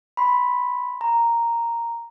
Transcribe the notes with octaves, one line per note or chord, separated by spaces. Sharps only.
B5 C6
A#5